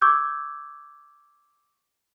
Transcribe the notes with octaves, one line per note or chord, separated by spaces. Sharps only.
C#6 D6 E6 G6 G#6